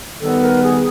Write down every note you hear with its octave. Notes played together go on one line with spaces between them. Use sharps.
D#3 G3 B3 A4
A#4
G#4